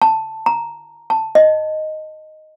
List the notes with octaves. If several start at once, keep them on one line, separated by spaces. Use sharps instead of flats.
A5
A#5
A5
D#5